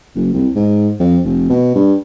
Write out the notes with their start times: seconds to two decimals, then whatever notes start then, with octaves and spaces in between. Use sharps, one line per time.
0.15 F#1
0.33 C2
0.55 G#2
1.00 F2
1.24 F1
1.49 B2
1.75 G2